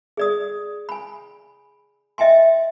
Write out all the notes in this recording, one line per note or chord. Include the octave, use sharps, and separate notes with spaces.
G#4 D5 D#6
G#5 B5
D#5 E5 G5 G#5 C6